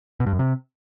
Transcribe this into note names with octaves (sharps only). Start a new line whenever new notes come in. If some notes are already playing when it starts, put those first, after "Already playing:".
B2
G2
F#2
C3